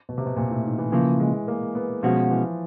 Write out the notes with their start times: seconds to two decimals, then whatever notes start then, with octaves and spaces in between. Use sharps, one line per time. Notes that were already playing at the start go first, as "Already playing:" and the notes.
0.09 B2
0.18 C3
0.26 B2
0.37 A#2
0.51 A2
0.65 D#3
0.79 E3
0.92 C#3 E3 F3 A#3
1.20 G#3
1.48 A#3
1.75 B3
2.03 B2 F3 G#3 C#4 F#4
2.31 E3